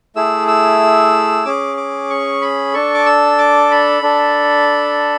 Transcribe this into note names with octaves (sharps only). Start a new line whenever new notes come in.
A3 E4 G#4 E6
E6
C#4 G#4 D6
D6
C#6
B5
D4 A4 C#6
D6
E6
D6
B5
D4 A4